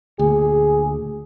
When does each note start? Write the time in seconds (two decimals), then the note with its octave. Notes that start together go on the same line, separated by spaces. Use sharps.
0.19 D2 A#2 G#4